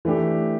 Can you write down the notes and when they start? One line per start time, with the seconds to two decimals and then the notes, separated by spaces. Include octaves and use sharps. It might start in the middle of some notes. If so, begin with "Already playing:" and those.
0.05 E3 A3 D4 G4